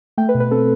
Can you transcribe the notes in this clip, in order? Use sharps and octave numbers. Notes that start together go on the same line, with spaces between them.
A3 G5
B4
B2
B4
C4 A4